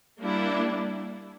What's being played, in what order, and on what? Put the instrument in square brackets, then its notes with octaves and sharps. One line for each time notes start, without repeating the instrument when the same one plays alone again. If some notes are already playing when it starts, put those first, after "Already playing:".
[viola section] G3 A#3 D4 E4